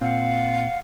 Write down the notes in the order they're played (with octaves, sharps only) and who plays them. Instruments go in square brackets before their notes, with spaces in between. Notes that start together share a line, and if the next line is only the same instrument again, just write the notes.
[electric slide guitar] A#2 C4 [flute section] F5 F#5